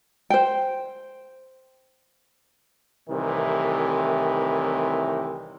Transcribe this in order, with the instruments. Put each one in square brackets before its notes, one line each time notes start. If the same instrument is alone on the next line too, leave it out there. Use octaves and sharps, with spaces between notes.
[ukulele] C5 G5
[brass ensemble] C2 A2 C3 D#3 E3